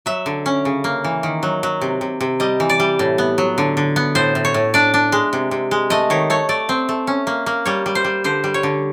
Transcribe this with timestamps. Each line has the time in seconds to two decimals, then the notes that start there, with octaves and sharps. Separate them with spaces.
0.06 F#3 E5
0.26 D3
0.46 C#4
0.65 C#3
0.84 A#3
1.04 E3
1.23 D#3
1.43 F#3
1.63 F#3
1.81 C3
2.01 C3
2.21 C3
2.40 G3 D#5
2.60 E3
2.69 D5
2.80 G3
2.99 A2
3.18 B3
3.38 F#3
3.58 D3
3.77 D3
3.96 B3
4.15 A2 C5
4.35 A2
4.45 C#5
4.54 A2
4.74 D4 D5
4.94 D4
5.12 G#3
5.33 C3
5.51 C3
5.71 G#3
5.90 A3 D#5
6.10 D#3 C#5
6.30 A3 C#5
6.49 A3 D5
6.69 C4
6.89 A3
7.07 C#4
7.27 A#3
7.46 A#3
7.65 G3 C#5
7.86 G3
7.95 C5
8.04 G3
8.24 D3 C5
8.44 G3
8.54 C#5
8.63 D3